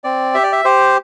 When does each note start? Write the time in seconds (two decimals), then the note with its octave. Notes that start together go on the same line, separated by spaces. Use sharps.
0.04 C4 D5
0.34 G4 E5
0.43 D5
0.52 E5
0.65 G4 C5